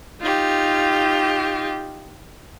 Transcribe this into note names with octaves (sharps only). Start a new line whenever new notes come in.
D#4 F4 G4